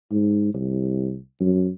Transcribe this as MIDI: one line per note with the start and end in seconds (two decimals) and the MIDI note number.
0.11 0.49 44
0.54 1.17 36
1.40 1.69 42